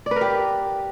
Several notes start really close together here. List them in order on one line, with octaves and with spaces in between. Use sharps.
D5 B4 A#4 G4